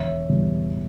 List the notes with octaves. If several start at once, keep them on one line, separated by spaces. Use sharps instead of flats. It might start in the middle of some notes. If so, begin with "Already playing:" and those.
Already playing: E1 C#5 E5
E2 B2 G3